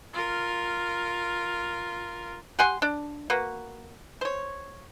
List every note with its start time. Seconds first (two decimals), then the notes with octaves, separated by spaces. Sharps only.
0.14 F4 A#4
2.59 G4 F#5 G#5 C6
2.82 D4
3.30 A#3 F#4 B4
4.21 C5 C#5